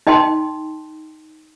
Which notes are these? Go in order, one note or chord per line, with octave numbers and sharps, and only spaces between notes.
D#4 D#5 G5 A5 C6